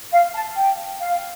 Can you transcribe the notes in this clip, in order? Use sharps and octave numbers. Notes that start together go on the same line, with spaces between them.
F5
A5
G5
F5